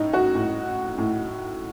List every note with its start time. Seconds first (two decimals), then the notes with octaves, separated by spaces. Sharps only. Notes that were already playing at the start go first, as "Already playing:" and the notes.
Already playing: A2 D#4
0.13 F#4
0.35 A2
0.98 A2